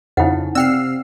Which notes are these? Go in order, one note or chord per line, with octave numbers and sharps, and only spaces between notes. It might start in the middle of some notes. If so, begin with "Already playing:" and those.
F2 C#3 D#4 E4 F#5
C3 C4 D5 G5 E6 F6 C7